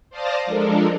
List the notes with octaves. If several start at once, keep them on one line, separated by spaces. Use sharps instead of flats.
C5 D5 F5 A5 D#6 A#6
F3 G#3 D4 A4 A#4